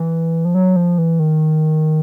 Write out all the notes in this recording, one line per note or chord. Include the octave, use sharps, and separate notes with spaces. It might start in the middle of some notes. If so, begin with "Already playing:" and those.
Already playing: E3
F3
F#3
F3
E3
D#3